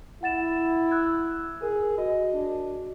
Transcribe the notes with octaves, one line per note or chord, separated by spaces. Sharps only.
E4 F#5 A6 E7
E6 F#6 G#6
G#4 A#4
F#4 D#5
D4